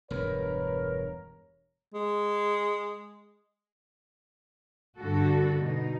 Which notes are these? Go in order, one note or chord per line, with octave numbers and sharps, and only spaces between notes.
E1 G2 A#4 B4 C#5
G#3
G2 D3 F#4 A4
B2 D#4